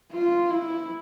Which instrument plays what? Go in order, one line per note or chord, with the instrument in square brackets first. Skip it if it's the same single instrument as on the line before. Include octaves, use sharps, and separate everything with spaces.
[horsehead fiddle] F4
E4